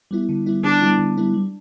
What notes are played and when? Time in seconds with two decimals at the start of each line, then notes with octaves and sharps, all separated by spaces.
0.11 G3 B3 E4
0.29 D3
0.46 G3 B3 E4
0.64 D3 D4
0.82 G3 B3 E4
0.99 D3
1.17 G3 B3 E4
1.34 G3